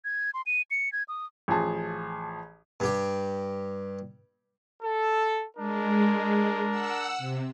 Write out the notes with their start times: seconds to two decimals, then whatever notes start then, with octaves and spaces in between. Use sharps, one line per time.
0.05 G#6
0.34 C6
0.46 D#7
0.71 C#7
0.93 G#6
1.08 D#6
1.48 A1 F3 G#4 A5
2.80 G2 G4
4.83 A4
5.57 G#3 D4 A#4
6.69 F#5 E6
7.18 C3